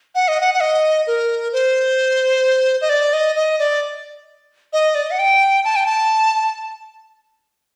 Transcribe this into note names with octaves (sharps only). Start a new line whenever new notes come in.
F#5
D#5
F#5
F#5
D#5
A#4
C5
D#5
D5
D#5
D#5
D5
D#5
D5
D#5
F#5
G5
A5
G5
A5